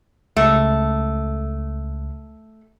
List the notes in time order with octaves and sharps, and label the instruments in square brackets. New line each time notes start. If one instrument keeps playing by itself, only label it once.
[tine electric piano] C#2 [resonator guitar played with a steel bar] A3